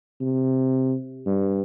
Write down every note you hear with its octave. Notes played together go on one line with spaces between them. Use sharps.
C3
G2